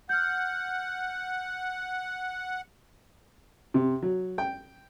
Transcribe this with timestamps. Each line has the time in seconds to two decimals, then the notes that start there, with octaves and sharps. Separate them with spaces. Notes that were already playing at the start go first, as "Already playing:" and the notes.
0.09 F#5 F6 G6
3.74 C3
4.03 F#3
4.38 G5